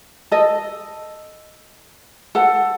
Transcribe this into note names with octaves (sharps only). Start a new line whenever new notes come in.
A4 D#5
A4 F#5